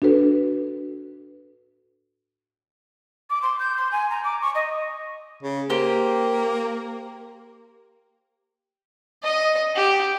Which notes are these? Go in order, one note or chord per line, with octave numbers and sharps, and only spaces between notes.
D4 F#4 A4 B4
D6
C6
G6
C6
G#5
A#5
D6
C#6
D#5
C#3
A#3 G4 C5
D#5
G4